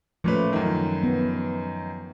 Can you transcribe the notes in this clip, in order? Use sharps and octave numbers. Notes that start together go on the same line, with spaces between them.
A#2 F3 A3 C#4 B4
F#2 D#3
B3